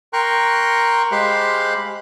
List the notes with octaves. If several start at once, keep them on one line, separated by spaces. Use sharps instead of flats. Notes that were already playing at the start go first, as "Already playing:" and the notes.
A#4 G5 A#5 C6 C#6 F#6
G#3 G4 C5 F5 B5 F#6